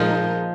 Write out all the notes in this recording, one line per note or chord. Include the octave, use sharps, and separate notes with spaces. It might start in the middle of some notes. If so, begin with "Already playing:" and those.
Already playing: A#2 F3 G#3 D#4 F4 A#4 D#5